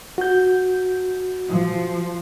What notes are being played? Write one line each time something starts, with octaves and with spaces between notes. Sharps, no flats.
F#4 G6
F3